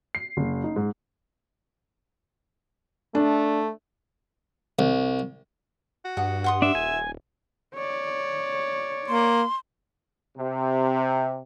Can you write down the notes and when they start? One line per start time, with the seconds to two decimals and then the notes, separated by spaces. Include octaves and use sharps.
0.15 C7
0.37 F#1
0.64 D#4
0.76 G#2
3.15 A3 D4
4.79 C2
6.05 F#4
6.17 G2 F#5 D#6
6.44 F#5 C6 D#6
6.62 D4 E5
6.75 D#1 G#5
7.75 C#5 D5
9.08 A#3 C6
10.38 C3